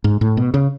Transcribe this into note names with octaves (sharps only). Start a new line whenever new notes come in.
G#2
A2
B2
C#3